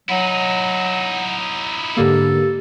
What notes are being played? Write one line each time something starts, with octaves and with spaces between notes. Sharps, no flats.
F#3 D#4 E4 F#5
G#2 D3 A#3 G4 A4